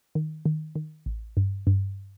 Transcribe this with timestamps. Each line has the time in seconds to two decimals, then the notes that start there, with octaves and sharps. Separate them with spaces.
0.15 D#3
0.46 D#3
0.75 D#3
1.06 A1
1.37 G2
1.67 G2